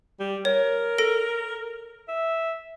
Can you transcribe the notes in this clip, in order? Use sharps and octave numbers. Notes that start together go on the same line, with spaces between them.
G3
A#4 C#5
A4 A#6 D7
E5